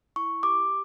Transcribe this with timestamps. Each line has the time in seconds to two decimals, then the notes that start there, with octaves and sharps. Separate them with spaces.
0.16 E4 C#6
0.43 G4 D6